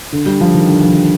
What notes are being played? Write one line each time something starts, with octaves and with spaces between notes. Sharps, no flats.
D3
G3
F3
D#3
D3
F3
D#3